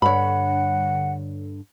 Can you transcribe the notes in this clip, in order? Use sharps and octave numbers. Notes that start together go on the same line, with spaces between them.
G2 D3 C#5 F#5 B5